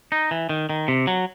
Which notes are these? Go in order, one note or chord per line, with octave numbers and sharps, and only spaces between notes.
D#4
E3
D#3
D#3
C3
F#3